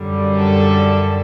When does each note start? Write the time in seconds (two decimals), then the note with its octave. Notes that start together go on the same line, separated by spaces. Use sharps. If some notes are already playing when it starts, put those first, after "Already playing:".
Already playing: F#2 D3 G3
0.36 A4